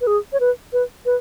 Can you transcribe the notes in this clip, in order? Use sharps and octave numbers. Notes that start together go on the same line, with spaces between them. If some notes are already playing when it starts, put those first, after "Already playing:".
B4
G#4
C#5
B4
B4
B4